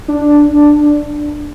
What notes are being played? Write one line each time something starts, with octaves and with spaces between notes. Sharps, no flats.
D4